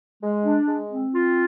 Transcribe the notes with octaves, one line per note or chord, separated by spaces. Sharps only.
G#3
D4
G#3
C4
F4